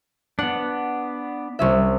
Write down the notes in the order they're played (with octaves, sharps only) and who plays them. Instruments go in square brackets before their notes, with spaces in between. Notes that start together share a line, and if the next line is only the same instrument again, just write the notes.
[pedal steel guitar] B3 D4 [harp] F#5
[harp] C2 C#4 E5